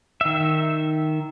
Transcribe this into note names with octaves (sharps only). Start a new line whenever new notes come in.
D#3 E5